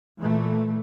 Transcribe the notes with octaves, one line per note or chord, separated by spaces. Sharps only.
A#2 E3 A3